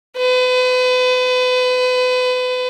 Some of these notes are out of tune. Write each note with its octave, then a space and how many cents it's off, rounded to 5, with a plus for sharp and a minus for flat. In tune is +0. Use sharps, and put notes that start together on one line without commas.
B4 +35